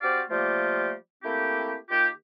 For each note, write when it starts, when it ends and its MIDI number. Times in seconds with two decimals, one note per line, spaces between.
0.02 0.22 60
0.02 0.22 66
0.02 0.22 67
0.02 0.22 72
0.02 0.22 74
0.02 0.22 77
0.30 0.92 53
0.30 0.92 55
0.30 0.92 57
0.30 0.92 58
0.30 0.92 65
0.30 0.92 67
1.23 1.75 57
1.23 1.75 58
1.23 1.75 60
1.23 1.75 64
1.23 1.75 67
1.90 2.09 51
1.90 2.09 58
1.90 2.09 65
1.90 2.09 67